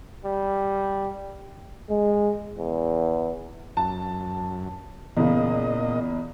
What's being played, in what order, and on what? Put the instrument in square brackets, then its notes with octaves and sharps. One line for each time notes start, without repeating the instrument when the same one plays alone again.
[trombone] G3
[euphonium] G#3
E2
[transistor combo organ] F#2 [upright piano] A5
[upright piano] E2 C#3 [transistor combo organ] A#2 D#5